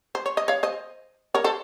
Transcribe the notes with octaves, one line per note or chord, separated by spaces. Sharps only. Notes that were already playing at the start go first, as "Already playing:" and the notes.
C5
C#5
D#5
C#5 F5
C5 D#5
A#4 C#5
A4 C5